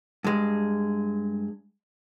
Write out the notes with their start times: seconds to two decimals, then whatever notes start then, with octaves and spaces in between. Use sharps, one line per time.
0.24 G2 G#3